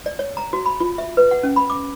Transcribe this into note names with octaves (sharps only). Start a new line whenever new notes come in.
D5
C#5
A#5
F#4
B5
F4
E5
B4
F#5
C#4
B5
D6